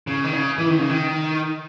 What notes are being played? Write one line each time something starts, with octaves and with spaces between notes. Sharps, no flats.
C#3
D#3
C#3
E3
D#3
C#3
D#3